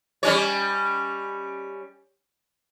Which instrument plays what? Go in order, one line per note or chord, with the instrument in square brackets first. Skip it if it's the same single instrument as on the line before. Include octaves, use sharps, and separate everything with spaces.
[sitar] G3 C#4 C#5